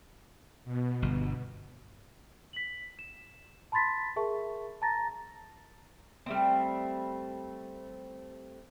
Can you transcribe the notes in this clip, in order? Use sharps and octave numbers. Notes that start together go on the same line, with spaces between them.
B2
G1
B6 F#7
E7
A5 B5 C6 A6 B6
G#4 A#4 E5 A5 C#6
A5 A#5 A6 A#6
G3 A3 C4